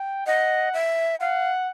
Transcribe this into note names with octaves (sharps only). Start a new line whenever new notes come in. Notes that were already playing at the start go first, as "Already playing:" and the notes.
Already playing: G5
D#5 F#5
E5
F5 F#5